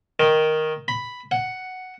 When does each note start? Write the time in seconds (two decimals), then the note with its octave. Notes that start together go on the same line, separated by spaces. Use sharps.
0.20 D#3
0.88 B5
1.31 F#5